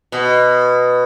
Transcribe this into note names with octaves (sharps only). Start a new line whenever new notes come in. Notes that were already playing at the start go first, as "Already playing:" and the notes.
B2